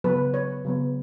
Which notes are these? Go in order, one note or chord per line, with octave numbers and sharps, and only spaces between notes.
C#3 F#3 B3 B4
C#5
C#3 F#3 B3